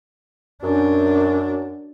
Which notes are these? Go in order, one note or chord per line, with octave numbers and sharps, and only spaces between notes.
F#2 D4